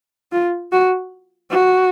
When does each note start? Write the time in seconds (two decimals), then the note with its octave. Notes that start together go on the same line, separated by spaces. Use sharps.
0.32 F4
0.72 F#4
1.50 F#4